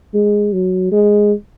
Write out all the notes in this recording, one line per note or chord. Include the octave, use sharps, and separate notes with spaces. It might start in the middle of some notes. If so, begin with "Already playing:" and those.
G#3
F#3
G#3